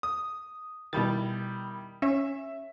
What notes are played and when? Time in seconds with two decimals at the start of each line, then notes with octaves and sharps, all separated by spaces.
0.03 D#6
0.93 B2 D#3 G3 E4 A6
2.02 C#4 E5